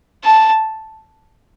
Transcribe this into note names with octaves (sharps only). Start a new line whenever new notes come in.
A5